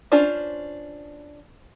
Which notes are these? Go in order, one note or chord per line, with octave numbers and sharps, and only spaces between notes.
C#4 D4 F4 C5 D5